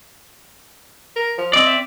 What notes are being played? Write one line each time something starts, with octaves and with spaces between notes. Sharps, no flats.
A#4
F3
C4 D5 D#5
E5